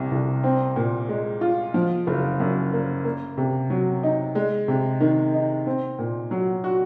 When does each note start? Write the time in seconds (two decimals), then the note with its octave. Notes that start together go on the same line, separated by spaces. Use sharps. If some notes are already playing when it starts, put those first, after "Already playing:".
Already playing: C2 C3
0.11 C2
0.44 C4
0.76 A#2
1.09 G#3
1.41 F4
1.74 F3
2.07 F#1
2.40 F#2
2.73 A#3
3.04 A#3
3.37 C3
3.70 F#3
4.03 D#4
4.35 G#3
4.68 C3
5.00 D#3
5.34 D#4
5.66 C4
5.99 A#2
6.31 F#3
6.64 F#4